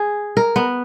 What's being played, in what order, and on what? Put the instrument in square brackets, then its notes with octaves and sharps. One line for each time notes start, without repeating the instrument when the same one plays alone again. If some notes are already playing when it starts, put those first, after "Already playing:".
Already playing: [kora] G#4
A#4
B3